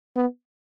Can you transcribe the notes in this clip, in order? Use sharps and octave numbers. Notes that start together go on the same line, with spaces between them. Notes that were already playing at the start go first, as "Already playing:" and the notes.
B3